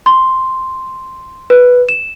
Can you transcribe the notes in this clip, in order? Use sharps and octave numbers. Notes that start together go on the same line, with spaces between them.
C6
B4
E7